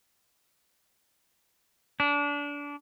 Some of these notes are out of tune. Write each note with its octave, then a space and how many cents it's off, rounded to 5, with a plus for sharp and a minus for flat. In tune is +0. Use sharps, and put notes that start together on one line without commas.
D4 -25